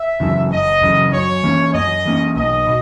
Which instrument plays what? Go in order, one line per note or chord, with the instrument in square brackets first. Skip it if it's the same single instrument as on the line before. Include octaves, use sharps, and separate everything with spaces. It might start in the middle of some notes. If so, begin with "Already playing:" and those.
Already playing: [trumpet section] E5
[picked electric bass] F#2 C#3 E3
[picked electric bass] F#1 [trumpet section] D#5
[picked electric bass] F#2 C#3 E3
[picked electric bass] F#2 [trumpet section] C#5
[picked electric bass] E3 A#3 C#4
[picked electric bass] F#2 [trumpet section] D#5
[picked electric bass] E3 A#3 C#4
[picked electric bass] B1 [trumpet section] D#5
[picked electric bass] B2